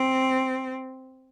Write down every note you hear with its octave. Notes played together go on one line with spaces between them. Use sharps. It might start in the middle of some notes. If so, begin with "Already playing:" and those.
Already playing: C4